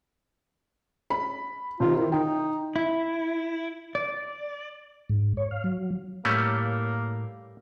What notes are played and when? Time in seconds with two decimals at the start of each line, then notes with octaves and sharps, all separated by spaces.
1.10 B5
1.80 C3 D#3 F4
1.96 D#3 E4
2.12 D#4 G5
2.76 E4
3.95 D5
5.09 G#2
5.37 C#5
5.51 F5
5.64 F#3
6.25 A2 G3 A3 A#3 C#4